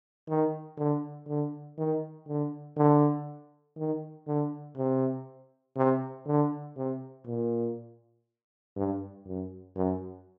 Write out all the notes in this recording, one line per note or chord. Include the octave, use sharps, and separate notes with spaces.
D#3
D3
D3
D#3
D3
D3
D#3
D3
C3
C3
D3
C3
A#2
G2
F#2
F#2